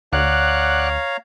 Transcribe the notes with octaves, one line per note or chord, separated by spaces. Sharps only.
D2 C#5 D5 F5 F#5 A#5 F#6